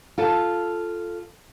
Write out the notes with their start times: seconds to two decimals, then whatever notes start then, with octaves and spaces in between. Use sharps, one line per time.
0.18 F4 A4 A5